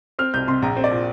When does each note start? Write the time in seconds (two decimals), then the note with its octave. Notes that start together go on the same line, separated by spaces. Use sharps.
0.19 C4 F6
0.34 C2 G6
0.48 C3 C6
0.62 A#1 A#5
0.77 C4
0.84 D5
0.91 A#2